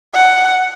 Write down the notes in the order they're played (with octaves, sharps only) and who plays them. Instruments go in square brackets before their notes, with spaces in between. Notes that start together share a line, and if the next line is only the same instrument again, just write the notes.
[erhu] F#5